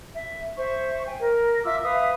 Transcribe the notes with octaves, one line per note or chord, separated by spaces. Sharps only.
E5
C5 E5 C#6
G5 G#5
A#4
F4 E5 D6 E6
B4 E5 F5 D#6